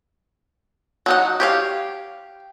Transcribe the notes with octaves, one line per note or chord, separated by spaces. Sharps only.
F#3 D#4 F#5
G4 C#5 F5